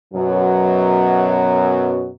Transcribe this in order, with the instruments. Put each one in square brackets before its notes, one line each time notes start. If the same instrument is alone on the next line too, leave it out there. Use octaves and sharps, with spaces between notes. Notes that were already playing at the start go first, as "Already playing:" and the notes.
[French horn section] F#2 B2 F#3